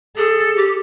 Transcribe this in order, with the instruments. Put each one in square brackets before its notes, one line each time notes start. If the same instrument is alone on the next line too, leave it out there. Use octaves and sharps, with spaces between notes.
[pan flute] G#4 [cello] A4
[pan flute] G4